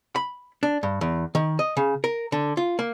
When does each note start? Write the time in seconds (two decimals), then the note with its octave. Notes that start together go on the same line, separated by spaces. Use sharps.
0.16 B5
0.63 D4
0.83 G2
1.01 E2
1.35 D#3
1.59 D#5
1.77 C#3
2.04 A#4
2.32 D3
2.57 F4
2.79 A#3